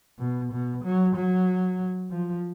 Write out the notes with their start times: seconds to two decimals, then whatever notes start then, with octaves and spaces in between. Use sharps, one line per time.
0.19 B2
0.52 B2
0.84 F#3
1.15 F#3
2.11 F3